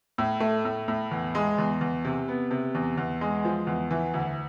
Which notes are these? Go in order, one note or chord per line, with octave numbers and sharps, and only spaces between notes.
A2
A3
A2
A2
E2
G#3
E2
E2
C3
B3
C3
E2
E2
G#3
F3
E2
E3
D2